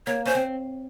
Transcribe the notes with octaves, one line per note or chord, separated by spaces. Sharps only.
A#3 C#5
C#4 C5
C4